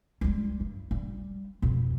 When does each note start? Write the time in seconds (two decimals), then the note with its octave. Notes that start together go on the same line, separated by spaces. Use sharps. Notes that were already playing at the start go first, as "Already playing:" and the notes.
0.21 G3 G#3
0.60 G2
0.91 G3
1.62 F2 B2